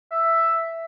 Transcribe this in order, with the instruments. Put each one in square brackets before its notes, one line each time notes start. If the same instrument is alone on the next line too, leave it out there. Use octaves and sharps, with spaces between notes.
[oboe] E5